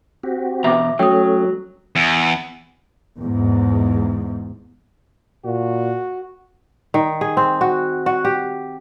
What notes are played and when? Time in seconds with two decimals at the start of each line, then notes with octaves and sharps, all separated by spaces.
0.23 C4 F#4 G4
0.64 E2 B2 E5 A#5 D6
0.99 F#3 A3 C#4 G5 D#6
1.96 E2
3.19 E2 G#2
5.45 A#2 F#4
6.94 D#3
7.21 G#4
7.37 C4
7.61 F#4
8.06 F#4
8.25 G4